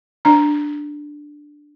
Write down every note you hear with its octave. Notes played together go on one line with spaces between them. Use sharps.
D4 A#5